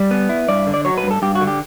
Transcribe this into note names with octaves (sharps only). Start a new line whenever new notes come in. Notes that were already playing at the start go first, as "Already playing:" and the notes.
Already playing: G3 D5
B3
E4
G2 D5
D3
D5
F#3 C#5
B4
G2
A4
G2 G4
F#4
D3
G4